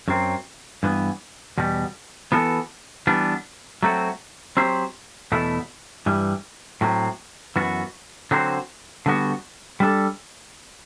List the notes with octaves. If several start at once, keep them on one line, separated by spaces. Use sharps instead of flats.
F#2 F#3 C4
G2 E3 B3
E2 B2 G3
E3 B3 F#4 A4
E3 G3 B3 D4
F#3 A3 C4 F#4
F#3 C4 G4 C5
E2 B2 A3 E4
G2 E3 G3
A2 F#3 C4
F#2 E3 B3 F#4
D3 F#3 C4 F#4 C5
D3 G3 B3 F#4
G3 D4 A4